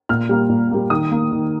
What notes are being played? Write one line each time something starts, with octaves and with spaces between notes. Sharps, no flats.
A#2 F6
G3 A#3
A#2
G3 A#3
D#3 D#6
A#3
D#3